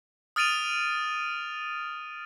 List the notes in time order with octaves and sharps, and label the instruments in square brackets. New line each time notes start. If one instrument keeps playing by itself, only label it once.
[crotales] D#6 F6 A6 D7 D#7 F7